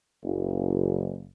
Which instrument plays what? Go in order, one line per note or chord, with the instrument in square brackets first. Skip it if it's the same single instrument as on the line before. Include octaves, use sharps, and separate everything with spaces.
[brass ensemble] F#1